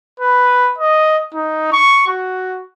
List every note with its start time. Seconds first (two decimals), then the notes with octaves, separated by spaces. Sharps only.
0.20 B4
0.78 D#5
1.34 D#4
1.73 C#6
2.08 F#4